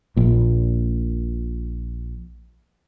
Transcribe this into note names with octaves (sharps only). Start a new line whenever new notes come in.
A#1 A#2